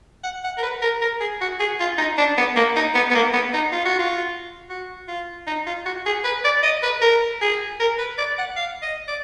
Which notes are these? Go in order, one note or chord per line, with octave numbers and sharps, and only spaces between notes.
F#5
F#5
A#4
B4
A#4
A#4
G#4
F#4
G#4
F4
D#4
D4
B3
A#3
D#4
B3
B3
A#3
B3
D#4
F4
F#4
F4
F#4
F4
D#4
F4
F#4
G#4
B4
D5
D#5
B4
A#4
G#4
A#4
B4
D5
F#5
F5
D#5
D5